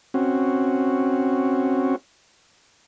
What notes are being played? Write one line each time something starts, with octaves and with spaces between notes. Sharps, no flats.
C4 C#4 F#4